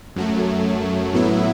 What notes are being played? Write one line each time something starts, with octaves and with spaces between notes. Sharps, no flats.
F#2 F#3 A3
A2 F#3 B3 E4